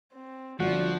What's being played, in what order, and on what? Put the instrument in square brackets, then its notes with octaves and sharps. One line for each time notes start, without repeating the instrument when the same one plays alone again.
[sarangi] C4
[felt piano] G1 [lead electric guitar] F3 [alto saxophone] F#4 [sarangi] D5